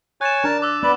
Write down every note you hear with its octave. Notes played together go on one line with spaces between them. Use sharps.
C#5 G#5 F#6 A6 E7
D4 A#4 A5
D6 E6 F#6
B3 B4 D5